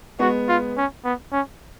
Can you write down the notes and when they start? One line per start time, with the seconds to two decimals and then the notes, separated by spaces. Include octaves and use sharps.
0.19 G#3 B3 F#4
0.49 F4
0.77 C#4
1.05 B3
1.33 C#4